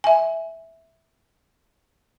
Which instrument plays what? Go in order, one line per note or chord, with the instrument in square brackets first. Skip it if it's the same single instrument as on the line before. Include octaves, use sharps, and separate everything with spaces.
[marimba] E5 G#5